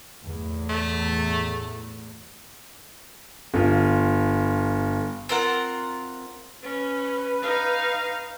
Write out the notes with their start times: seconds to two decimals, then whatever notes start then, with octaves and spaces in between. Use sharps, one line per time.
0.25 E2 A2
0.70 A3
3.54 G1 F4
5.29 C4 F4 A#4 F#5
6.63 C#4 B4
7.42 D#4 F5